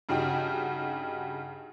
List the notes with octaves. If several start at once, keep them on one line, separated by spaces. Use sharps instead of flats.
G2 C#3 D#4 F#4 G4 G5